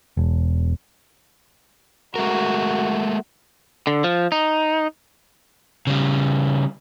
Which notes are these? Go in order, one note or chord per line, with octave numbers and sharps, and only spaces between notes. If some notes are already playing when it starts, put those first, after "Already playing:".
E1
G#3 A3 F#4 A#4
D3
F3
D#4
C#3 G3